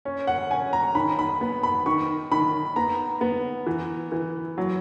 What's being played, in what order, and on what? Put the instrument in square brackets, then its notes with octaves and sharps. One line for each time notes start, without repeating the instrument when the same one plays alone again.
[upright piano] C#4
F#5
C#4 G#5
A#5
D#3 B5
B5
B3
B5
D#3 C#6
D#3 B5
B3 A#5
B3
E3
E3
F#3